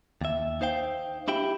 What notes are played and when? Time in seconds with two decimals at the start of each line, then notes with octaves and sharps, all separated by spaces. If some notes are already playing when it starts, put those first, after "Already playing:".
0.21 D#2 E5
0.61 D#4 C5 F5 G5
1.28 D4 E4 G4 G5